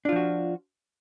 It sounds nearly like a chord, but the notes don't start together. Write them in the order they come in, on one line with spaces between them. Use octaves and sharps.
D4 F4 F3 F#4